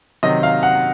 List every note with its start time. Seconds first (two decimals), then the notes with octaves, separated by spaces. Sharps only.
0.23 C3 D#3 F#3 D#5
0.43 F5
0.63 F#5